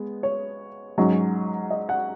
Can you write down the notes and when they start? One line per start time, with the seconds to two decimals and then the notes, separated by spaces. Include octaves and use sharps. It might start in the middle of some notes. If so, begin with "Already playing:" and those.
Already playing: G#3 B3
0.23 C#5
0.98 G#2 F#3 C#4
1.71 D#5
1.89 F#5